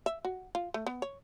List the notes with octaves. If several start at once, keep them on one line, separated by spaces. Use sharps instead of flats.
E5
F#4
F4
A3
B3
C#5